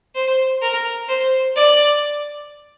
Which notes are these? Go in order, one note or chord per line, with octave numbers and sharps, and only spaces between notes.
C5
A#4
C5
D5